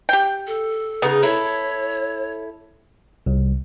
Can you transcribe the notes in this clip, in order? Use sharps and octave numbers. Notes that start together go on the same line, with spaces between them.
G4 G5
A4
C#3 B3 D#4 G#4
E4 A4 C#5
C2